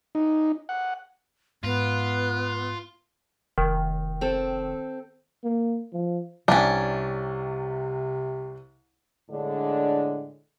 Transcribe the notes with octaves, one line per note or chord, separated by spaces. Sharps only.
D#4
F#5
G#2 B3 F4
F1 D#3
C4 A4
A#3
F3
C2 C3 C#4 D4
A2 D3 G#3 D4